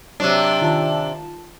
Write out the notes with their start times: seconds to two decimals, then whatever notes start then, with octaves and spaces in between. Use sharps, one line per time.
0.20 C3 F#3 D4 C#5
0.62 D#3 F4 A5